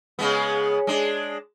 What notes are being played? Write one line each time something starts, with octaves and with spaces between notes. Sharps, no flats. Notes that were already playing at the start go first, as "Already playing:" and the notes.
C#3 G#3 B3
G#3 D4